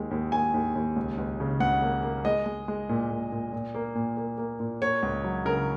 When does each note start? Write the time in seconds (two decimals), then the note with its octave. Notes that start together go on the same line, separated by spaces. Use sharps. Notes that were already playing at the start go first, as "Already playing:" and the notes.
Already playing: D#2 G#3
0.11 D#2
0.32 D#2 G#5
0.54 D#2
0.75 D#2
0.96 C#2
1.18 C#2
1.40 C#3
1.60 C#2 F#5
1.82 A#3
2.03 A#3
2.25 G#3 D#5
2.46 G#3
2.68 G#3
2.89 A#2
3.10 A#2
3.32 A#2
3.53 A#2
3.75 A#3
3.95 A#2
4.17 A#3
4.38 A#3
4.60 A#2
4.82 A#3 C#5
5.03 C#2
5.24 F#3
5.45 C#3 A#4